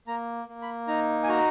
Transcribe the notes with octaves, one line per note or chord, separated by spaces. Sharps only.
A#3 A#5
A#3
B5
D#4 A#5
G#5
F#4 A#5